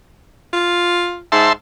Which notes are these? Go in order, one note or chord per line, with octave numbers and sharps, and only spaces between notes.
F4
G#2 E5 A5 C6